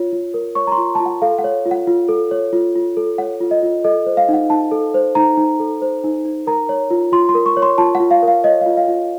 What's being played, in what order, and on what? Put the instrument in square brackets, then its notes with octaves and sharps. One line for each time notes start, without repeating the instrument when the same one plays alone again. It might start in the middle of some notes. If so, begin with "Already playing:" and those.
Already playing: [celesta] F4 C#5
F4
A#4
C#5 C#6
A#5
C6
F4
A5
F4
F#5
A4 F5
F#5
C#5
F4
F#5
F4
A4
C#5
F4
F4
A4
C#5 F#5
F4
D#5
F4
A4 D#5
C5
F5
D#4 F#5
D#4 A5
A4
C5
D#4 A#5
D#4
A4
C5
D#4
D#4
A#4 A#5
C#5
F4
F4 C6
C6
A#4
C#6
C#5
C6
F4 A5
F#5
F4
F5
A#4
F5
C#5 D#5
F4 F5
F5
F4